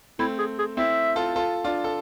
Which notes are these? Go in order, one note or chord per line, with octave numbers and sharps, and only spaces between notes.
A3 C4 E4
G#4
G#4
C4 E4 E5
F4 A4
F4 A4
D4 F4
A4